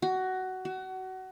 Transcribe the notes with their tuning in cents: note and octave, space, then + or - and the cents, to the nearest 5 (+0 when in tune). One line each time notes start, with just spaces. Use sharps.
F#4 +15
F#4 +25